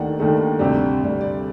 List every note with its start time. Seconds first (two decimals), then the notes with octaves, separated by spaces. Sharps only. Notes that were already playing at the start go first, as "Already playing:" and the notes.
Already playing: D#2 D#3 A3 D4 F#5
0.19 D#2 D#3 A3 D4
0.59 D2 C3 G3
1.01 D2 C3 G3
1.21 D5